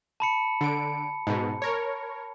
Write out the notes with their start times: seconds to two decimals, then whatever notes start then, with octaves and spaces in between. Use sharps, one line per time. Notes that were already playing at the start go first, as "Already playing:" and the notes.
0.20 A5 B5 C#7
0.61 D3 D7
1.27 G#2 B2
1.62 A#4 C#5